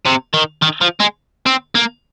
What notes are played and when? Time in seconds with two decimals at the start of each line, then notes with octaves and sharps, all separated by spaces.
0.05 C3
0.34 D#3
0.62 D#3
0.81 F3
1.00 G#3
1.46 C4
1.75 A#3